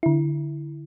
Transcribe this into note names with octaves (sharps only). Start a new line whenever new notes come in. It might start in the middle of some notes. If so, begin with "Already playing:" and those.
D3 E4